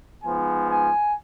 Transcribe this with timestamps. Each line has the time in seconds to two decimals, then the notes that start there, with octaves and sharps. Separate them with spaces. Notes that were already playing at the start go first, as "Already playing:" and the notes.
0.23 G#2 F3 B3 G#5
0.70 G#5